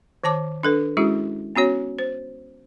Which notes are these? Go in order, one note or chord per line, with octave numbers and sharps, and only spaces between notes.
D#3 C#5 A5 D6
D4 A4 B4
G#3 C#4 E4 F#4 G#4
B3 C#4 F#4 C#5
C5